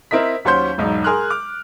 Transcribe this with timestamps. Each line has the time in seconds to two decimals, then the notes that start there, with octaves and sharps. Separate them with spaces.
0.11 C4 E4 A#4 D#5 B6
0.45 D#2 F#3 C#4 C5 C6 G6
0.78 E1 B1 G#2 D#4
1.04 G#4 A#4 C6 F6 F#6
1.30 D6 F6